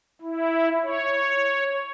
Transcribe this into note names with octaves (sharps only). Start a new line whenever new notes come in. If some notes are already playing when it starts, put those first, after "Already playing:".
E4
C#5